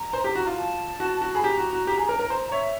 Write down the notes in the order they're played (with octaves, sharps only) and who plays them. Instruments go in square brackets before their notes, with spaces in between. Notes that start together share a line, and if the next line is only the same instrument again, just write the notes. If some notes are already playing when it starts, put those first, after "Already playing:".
Already playing: [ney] A#5
[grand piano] C5
G4
F#4
F4
[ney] A5
[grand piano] F#4
F#4
[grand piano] G#4 [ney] B5
[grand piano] G4 [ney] A#5
[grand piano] F#4
F#4
G4
G#4
A#4
A#4
[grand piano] C5 [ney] A#5
[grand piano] C#5 [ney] E5